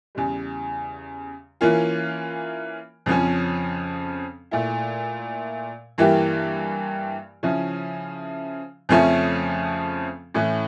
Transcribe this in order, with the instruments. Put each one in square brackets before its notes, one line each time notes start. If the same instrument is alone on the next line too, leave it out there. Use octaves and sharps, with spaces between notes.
[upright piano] E2 C#3 G3
E3 A#3 C#4 F4
F2 C#3 F3 C#4
A#2 A3 E4
G2 E3 A#3 E4 G4
C#3 F3 C#4 E4
F2 C#3 F3 A3 C#4
A2 E3 A3 C#4